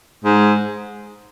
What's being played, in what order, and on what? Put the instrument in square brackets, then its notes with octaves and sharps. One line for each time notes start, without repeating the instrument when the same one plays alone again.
[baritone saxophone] G#2